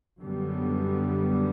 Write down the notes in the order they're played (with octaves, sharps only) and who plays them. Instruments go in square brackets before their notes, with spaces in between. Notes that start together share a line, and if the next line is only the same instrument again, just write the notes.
[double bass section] F#2 D3 G3 B3